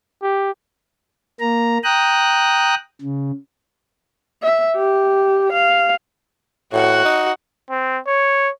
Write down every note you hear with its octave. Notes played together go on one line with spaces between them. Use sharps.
G4
A#3 A#5
G5 A#5 D#6 F#6
C#3
E5
G4
F5
A2 F#4 F#5
D#4
C4
C#5